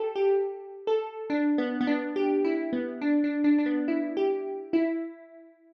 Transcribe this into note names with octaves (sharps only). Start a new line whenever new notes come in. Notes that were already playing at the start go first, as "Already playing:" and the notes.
Already playing: G4 A4
G4
A4
D4
B3
B3
D4
G4
E4
B3
D4
D4
D4
D4
B3
E4
G4
E4